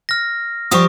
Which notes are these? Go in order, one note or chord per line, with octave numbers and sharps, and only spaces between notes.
F6 A#6
F3 G3 G4 C#6 D#6